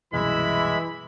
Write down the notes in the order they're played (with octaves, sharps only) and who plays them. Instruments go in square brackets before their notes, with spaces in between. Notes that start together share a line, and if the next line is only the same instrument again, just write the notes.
[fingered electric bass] C2 F#2 B2 [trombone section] E3 [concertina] G#3 [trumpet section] E4 E5 B5